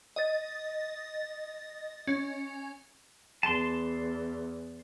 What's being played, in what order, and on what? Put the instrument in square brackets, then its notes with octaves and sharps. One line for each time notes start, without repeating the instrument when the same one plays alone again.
[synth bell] D#5 A6
C#4
[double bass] E2 [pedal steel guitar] A5 C6